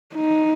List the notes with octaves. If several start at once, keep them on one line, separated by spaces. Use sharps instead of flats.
D#4